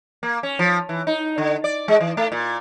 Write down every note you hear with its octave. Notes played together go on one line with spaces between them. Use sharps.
A#3
C#4
F3
E3
D#4
D3
D5
G#3
E3
A3
A#2